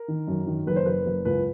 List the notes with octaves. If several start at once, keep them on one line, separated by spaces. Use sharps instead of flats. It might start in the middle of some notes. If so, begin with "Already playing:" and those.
Already playing: A#4
D#3
F#2
D#3
F#1 B4
C5
F#1 B4
F#1
C#2 B4